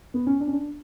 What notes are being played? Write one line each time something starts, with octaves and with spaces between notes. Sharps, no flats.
B3
C#4
D4
C#4
D4